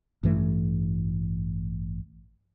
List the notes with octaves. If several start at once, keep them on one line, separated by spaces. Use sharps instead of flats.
A1 G2 E3 A3